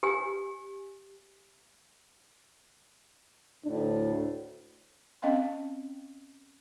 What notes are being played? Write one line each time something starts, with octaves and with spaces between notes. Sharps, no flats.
G4 G#5
D2 A2 D4
C4 C#4 D#5 F5 G5 C6